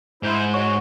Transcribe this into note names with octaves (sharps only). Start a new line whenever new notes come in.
G#2 E4 C5
G#3 F#4 C#5 C#6